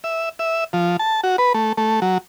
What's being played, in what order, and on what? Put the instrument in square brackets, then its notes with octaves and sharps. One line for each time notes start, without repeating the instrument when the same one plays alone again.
[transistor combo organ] E5
E5
F3
A5
F#4
B4
A3
A3
F#3